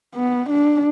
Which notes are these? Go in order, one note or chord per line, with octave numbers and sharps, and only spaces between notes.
B3
D4